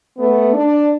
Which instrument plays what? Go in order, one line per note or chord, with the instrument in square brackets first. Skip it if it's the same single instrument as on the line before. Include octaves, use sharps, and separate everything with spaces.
[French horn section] A3 B3
D4